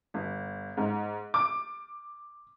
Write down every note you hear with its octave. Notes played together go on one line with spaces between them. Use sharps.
G1
G#2
D6